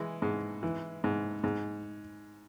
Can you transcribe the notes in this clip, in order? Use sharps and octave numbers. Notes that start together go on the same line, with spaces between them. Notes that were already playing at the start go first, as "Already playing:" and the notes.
Already playing: E3 G#3
G#2
E3
G#2
G#2